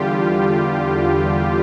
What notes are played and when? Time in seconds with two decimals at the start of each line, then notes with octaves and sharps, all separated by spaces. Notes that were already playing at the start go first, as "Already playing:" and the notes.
Already playing: E2 D3 G3 F4 G4